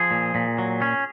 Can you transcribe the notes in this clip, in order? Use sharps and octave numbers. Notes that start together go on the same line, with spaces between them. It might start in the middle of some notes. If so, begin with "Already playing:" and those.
Already playing: F3 G#4
A#2
A#2
F#3
C#4